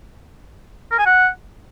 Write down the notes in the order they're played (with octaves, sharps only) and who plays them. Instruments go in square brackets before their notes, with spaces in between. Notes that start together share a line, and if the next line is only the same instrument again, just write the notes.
[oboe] A#4
G#5
F#5